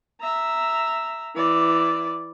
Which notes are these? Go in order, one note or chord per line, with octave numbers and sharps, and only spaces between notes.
E5 A#5
E3 D5